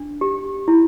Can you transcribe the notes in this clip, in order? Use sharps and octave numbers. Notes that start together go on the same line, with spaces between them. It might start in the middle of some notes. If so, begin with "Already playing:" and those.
Already playing: D4
G4
E4